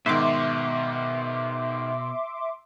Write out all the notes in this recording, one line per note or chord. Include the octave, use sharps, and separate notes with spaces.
G#2 B2 D#3 E5 C6 D6